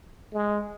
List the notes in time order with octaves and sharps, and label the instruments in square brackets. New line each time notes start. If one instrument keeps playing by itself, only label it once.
[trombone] G#3